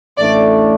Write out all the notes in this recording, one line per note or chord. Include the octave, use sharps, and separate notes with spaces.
A1 A2 A3 D4 D5